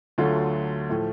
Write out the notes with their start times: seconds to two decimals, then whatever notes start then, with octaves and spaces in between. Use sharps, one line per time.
0.18 D2 D3 F#3 A3 F4
0.89 A2 F3 A3